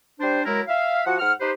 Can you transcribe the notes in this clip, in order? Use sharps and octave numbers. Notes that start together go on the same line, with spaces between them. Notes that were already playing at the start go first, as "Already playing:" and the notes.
G3 D4 C5
F#3 G#3 E4 A#4
E5 F5
F3 F#4 F#5
G#2 F#5 F6
D#4 G4 B4 C5